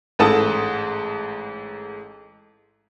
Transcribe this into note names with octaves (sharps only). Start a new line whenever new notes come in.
A1 G#2 A4 A5 D#6